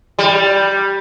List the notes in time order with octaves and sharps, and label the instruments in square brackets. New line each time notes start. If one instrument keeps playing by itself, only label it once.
[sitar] G3